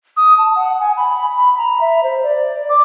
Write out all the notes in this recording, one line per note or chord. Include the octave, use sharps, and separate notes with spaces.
D#6
A5
F#5
G#5
B5
B5
A#5
E5
C5
D5
D6